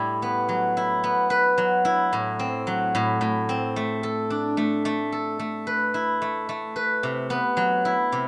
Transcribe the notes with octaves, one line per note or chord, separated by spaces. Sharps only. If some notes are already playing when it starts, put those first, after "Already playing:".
Already playing: A2 G3 E4
B3
F#3
E4
B3
B4
F#3
E4
A2
C4
F#3
A2
A2
C4
A3
A4
D4
A3
A3
A4
A3
B4
E4
A3
A3
B4
C3
B3
F#3
E4
C3